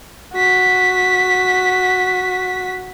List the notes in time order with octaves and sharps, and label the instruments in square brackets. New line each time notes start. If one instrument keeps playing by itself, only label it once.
[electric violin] F#4 B6